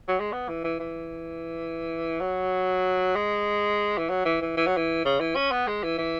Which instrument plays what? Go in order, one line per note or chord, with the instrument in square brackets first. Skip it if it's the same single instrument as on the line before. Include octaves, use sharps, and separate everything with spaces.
[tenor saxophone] F#3
G#3
B3
E3
E3
E3
F#3
G#3
E3
F#3
E3
E3
E3
F#3
E3
C#3
E3
C#4
B3
G#3
E3
E3